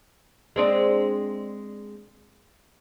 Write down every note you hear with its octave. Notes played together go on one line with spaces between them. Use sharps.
G#3 C4 D4